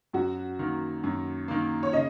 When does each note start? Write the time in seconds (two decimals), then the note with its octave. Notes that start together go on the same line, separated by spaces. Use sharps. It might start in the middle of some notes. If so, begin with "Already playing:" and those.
0.13 F#2 F#4
0.59 D#3 A#3
1.04 F#2
1.48 D#3 A#3
1.83 C#5
1.93 C#3 D#5